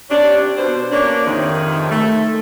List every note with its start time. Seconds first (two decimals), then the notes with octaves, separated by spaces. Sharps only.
0.10 C3 C#4 D4
0.57 B2 C5
0.91 A#3 C#4 D4
1.25 F2 G#2 C3 D#3
1.90 A3